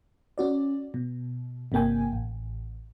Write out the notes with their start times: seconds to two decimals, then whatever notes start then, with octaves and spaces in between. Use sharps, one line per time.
0.38 C#4 F#4 D5
0.94 B2
1.72 G1 C3 A#3 G5 G#5
2.12 A1